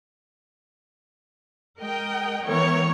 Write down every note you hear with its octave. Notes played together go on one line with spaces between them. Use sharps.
G#3 A#4 D#5 G5
E3 B3 A#4 C#5